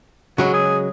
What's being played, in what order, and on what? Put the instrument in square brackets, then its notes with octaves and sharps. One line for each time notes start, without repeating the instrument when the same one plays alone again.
[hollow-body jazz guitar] C#3 F#3 G#3 [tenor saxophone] F#4
[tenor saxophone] G#4